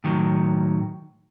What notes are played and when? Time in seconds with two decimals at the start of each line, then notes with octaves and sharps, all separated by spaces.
0.04 A2 D#3 F#3